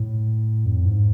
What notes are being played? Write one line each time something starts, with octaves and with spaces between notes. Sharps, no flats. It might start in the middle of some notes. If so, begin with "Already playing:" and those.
Already playing: A2
F2
G#2